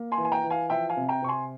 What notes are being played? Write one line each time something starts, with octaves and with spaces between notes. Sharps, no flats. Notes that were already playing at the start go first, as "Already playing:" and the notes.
Already playing: A#3
G#5 C6
E3
G#5
G5 A#5
E3
F5 G#5
F3 E5 G5
F5 G#5
C3
G5 A#5
C3 C#6
G#5 C6